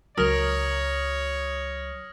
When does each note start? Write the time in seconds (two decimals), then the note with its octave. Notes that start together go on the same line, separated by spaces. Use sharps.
0.18 C#2 F#3 A#4 C#5 D#6 F6 A#6